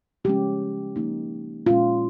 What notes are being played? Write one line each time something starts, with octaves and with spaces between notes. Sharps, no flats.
C#3 F3 G#3 C#4 G4
F3 A#3 D#4
A#2 G#3 C#4 F4